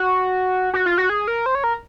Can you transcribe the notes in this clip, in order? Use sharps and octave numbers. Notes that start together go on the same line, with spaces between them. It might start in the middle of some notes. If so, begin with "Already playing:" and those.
Already playing: F#4
F#4
F4
F#4
G#4
A#4
C5
C#5
A#4